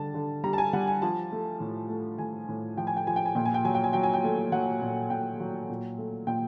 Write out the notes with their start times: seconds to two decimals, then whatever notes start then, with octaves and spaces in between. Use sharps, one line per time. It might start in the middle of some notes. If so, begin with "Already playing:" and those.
Already playing: D3 G3 A5
0.14 D3
0.44 G3 A#5
0.53 A5
0.58 G#5
0.73 G3 F#5
0.87 G#5
1.02 F3 A5
1.32 A3
1.60 A2
1.89 A3
2.18 A2 G#5
2.49 A2
2.77 F3 G5
2.87 G#5
2.97 G5
3.07 F3 G#5
3.16 G5
3.26 G#5
3.35 A#2 G5
3.45 G#5
3.54 G5
3.64 F#3 G#5
3.75 G5
3.84 G#5
3.93 F#3 G5
4.03 G#5
4.14 G5
4.24 A3
4.52 F#3 F#5
4.82 A#2
5.10 A#2 G5
5.40 F#3
5.70 A#2
5.98 A3
6.27 A#2 G5